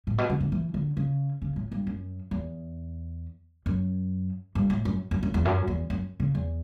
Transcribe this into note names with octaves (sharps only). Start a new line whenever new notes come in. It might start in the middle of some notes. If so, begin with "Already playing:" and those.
A2
B2
C#3
D3
E3
D3
C#3
C#3
A2
G2
F#2
E2
F#2
G2
A2
F#2
F#2
F#2
E2
F#2
E2
F#2
C#3
E2